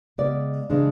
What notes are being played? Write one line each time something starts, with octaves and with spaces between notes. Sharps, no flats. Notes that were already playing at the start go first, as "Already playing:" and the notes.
C#3 G#3 B3 D5
C#3 E3 G#3 D4